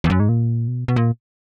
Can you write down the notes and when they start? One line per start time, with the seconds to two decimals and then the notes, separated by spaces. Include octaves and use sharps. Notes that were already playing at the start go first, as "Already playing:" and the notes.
0.04 E2
0.10 F#2
0.20 G#2
0.29 A#2
0.68 B2
0.88 B2
0.96 A#2